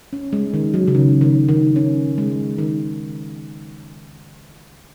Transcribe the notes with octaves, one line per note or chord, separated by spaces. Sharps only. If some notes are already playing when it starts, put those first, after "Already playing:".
C#4
G#3
D#3
F#3
C#3
D#3
D#3
D#3
C#4
G#3
D#3